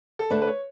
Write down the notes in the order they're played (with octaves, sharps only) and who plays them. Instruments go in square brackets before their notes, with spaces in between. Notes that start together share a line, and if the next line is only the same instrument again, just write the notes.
[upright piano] A4
[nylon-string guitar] D2 D3 A3 D4 [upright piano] B4
[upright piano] B4
C#5